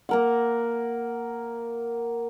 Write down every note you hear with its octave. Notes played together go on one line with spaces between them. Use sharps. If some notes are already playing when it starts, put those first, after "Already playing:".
A#3 A#4 F#5